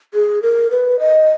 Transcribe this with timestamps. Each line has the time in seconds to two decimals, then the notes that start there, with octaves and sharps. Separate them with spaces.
0.14 G#4
0.42 A#4
0.71 B4
0.99 D#5